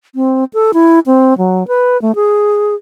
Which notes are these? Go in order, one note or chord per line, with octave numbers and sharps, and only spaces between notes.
C4
A4
E4
C4
F#3
B4
A3
G#4